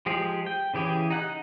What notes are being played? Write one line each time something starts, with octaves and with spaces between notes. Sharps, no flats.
F3 G#3 G4 G#4
G5
C#3 E3 G4 G#4
D#4 F#5 F#6